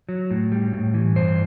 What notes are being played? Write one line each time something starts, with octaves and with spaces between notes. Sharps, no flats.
F#3
A2
G3
A2
E3
G2 C5